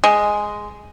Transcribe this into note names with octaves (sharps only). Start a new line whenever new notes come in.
G#3